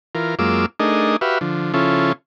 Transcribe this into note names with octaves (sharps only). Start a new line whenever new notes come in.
E3 F4 A#4
F#2 G#3 A#3 F4 D6 E6
A3 D4 D#4 G#4 A#4 D#5
F#4 G4 B4 E5 F5
D3 F3
C#3 F3 C#4 E4 F4 A4